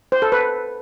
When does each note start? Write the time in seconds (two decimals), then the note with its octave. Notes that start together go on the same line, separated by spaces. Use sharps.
0.12 C5
0.22 A4
0.32 B4